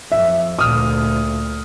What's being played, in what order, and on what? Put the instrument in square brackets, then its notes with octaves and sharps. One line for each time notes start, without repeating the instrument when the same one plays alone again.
[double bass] F2 [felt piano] E5
[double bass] D2 A#2 [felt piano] D#6 F6